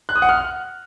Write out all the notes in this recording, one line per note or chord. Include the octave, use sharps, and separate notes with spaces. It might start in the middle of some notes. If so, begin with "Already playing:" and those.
F#6
D#6
F#5
F6